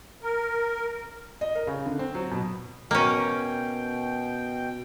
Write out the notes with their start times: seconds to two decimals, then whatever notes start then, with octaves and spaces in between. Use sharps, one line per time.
0.23 A#4
1.41 D#5
1.55 A#4
1.67 C#3
1.86 D3
1.99 C4
2.15 F#3
2.31 B2
2.91 B2 A#3 C#4 G5